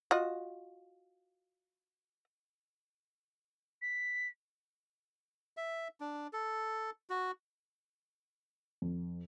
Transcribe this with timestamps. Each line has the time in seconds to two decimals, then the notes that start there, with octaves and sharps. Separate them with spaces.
0.11 F4 F#4 D#5
3.82 B6
5.57 E5
6.00 D4
6.33 A4
7.10 F#4
8.82 F2